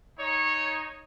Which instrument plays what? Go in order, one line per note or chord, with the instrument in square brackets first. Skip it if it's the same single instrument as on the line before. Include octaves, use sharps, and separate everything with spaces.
[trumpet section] D#4 C#5